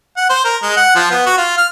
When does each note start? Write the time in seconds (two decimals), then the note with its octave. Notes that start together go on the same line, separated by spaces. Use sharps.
0.17 F#5
0.30 C5
0.45 A#4
0.63 G#3
0.77 F#5
0.95 F3
1.11 B3
1.26 F#4
1.38 F4
1.58 F6